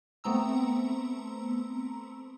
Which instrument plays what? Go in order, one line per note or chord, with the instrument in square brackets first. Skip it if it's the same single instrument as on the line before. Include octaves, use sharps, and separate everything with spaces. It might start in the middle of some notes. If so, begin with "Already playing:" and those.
[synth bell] A3 B3 C4 A#5 E6